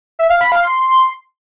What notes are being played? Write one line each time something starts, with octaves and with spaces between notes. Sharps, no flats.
E5
F5
B5
F5
C6